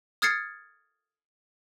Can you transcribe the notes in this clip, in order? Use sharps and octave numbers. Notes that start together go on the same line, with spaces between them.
D#6 F6 G#6 A6 C7 C#7